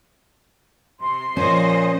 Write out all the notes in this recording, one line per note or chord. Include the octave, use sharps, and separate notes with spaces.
C3 C6
A#2 F3 C#4 C5 D#5